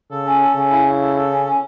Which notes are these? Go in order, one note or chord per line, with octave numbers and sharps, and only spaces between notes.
C#3 A4
C#4
A4
C#3 C#4
E4
E4
A4
A4
C#4
C#4